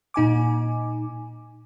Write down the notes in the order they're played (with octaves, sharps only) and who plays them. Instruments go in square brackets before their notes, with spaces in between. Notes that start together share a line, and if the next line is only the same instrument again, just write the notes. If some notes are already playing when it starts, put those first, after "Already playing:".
[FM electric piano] A#2 D#4 G#5 D6